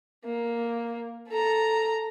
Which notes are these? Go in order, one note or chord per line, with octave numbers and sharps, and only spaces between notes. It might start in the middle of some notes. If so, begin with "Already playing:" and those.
A#3
A4 A#5